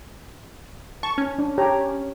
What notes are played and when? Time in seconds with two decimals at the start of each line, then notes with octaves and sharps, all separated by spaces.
1.03 A5 C#6
1.18 C#4
1.39 D4
1.58 G4 C#5 A#5